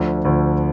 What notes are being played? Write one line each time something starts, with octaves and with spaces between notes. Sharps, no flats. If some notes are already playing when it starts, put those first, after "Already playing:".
Already playing: D2 D3 F3
D2 D3 F3